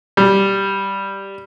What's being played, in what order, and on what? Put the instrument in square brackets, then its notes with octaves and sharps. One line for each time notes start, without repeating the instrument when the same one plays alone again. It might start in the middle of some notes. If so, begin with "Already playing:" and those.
[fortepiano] G3